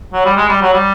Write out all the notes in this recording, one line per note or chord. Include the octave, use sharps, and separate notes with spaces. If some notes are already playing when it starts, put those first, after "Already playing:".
F#3
G3
G#3
G3
F#3
G3